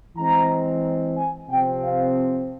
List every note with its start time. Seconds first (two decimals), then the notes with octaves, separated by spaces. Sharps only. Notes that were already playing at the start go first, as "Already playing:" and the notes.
0.17 E3 G#3 C4 A#5
1.17 G#5
1.50 C3 F3 C4 G5
1.83 F5